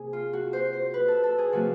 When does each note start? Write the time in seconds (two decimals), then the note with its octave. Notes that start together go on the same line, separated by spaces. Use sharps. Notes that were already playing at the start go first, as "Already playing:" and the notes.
Already playing: C3 A#3 G#4
0.13 F4
0.33 F#4
0.53 C5
0.73 C5
0.94 B4
1.08 A4
1.24 A4
1.38 G#4
1.52 C3 F3 A3 C4 F#4